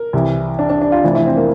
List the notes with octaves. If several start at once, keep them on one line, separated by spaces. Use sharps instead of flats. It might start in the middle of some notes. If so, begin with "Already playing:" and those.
Already playing: A#4
C2 C3 E3
D4
D4
D4
F4
F1 F2 E3
E4
C4
A#3